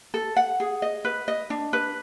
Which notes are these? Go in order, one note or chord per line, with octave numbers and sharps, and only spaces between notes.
A4
F#5
G#4
D#5
B4
D#5
D4
B4